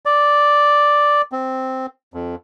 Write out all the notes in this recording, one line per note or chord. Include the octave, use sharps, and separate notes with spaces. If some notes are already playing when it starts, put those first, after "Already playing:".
D5
C4
F2